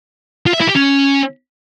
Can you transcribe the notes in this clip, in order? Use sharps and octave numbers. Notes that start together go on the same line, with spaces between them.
F4
E5
E4
G4
C#4